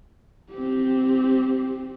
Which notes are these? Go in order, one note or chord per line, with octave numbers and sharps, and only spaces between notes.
C4 G4